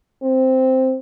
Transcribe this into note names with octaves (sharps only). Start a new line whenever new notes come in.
C4